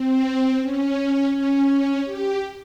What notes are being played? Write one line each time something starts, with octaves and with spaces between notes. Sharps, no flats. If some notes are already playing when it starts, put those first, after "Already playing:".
Already playing: C4
C#4
C#4
G4